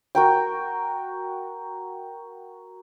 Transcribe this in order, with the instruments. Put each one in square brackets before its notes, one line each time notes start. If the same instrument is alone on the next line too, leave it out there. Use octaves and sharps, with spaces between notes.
[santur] F#4 A#4 G5